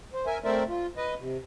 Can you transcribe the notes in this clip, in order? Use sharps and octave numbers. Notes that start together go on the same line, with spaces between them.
C5
A#4 E5 G#5
A3 C4 A#4 C5 D5 E5
F4
B4 D#5
C3